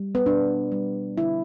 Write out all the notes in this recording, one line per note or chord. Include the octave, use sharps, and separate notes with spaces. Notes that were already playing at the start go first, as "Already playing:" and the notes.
Already playing: G3
B3
B2 D4
G3
D3 E4